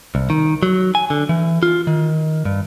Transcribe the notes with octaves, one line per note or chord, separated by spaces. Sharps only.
C2
D#3
F#3
G#5
D3
E3
F4
D#3
G2